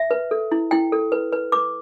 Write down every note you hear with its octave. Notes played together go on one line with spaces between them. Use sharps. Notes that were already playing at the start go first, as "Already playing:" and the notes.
Already playing: E5
B4
A4
E4
E4 G5
A4
B4
B4
B4 D6